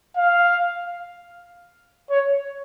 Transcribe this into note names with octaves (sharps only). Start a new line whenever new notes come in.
F5
C#5